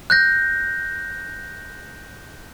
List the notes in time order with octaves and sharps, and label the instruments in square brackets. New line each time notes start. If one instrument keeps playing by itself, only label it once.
[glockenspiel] F#6 G6 A#6